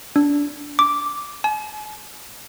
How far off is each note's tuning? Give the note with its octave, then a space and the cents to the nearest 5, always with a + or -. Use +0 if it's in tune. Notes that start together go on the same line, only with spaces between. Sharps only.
D4 -20
D6 -5
G#5 +45